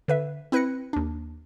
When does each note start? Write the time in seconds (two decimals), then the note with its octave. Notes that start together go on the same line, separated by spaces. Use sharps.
0.08 D3 B4 E5
0.52 C4 E4 B4 F#6 A#6 C#7
0.93 D#2 D4